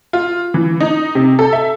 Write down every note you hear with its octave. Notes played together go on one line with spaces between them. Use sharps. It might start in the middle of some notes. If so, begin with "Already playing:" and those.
F4
E3
D#4
C3
A4
E5